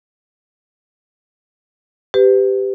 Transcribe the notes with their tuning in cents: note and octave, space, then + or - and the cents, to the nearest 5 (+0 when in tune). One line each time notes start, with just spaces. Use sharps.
G4 +0 B4 +35